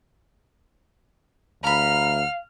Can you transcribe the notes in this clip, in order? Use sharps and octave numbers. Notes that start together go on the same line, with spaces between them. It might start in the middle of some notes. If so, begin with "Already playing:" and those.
D2 F5 A#5 B5 F6